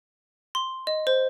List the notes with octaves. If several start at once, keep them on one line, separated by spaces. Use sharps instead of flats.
C6
D#5
C5